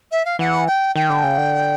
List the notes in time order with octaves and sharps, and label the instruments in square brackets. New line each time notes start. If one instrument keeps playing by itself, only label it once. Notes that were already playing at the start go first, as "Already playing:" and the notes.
[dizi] E5
F5
[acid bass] E3 [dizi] F#5
[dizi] G5
[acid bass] D#3 [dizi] G5
[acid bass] D3
C#3
D3